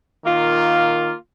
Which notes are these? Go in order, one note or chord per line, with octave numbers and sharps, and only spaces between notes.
D#3 A#3 F4